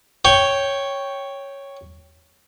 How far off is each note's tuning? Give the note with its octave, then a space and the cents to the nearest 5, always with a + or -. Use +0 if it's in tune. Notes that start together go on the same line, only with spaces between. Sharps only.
C#5 +0 G5 +0 C#6 +0